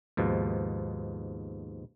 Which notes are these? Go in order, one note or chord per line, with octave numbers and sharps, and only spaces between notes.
D#2 G#2 B2 F3